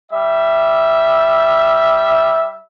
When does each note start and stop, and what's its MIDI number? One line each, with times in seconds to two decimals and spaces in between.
0.12 2.57 55
0.12 2.57 76